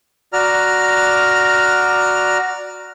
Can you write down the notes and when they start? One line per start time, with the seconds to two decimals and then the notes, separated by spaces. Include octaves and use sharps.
0.33 F#4 D5 A#5 F6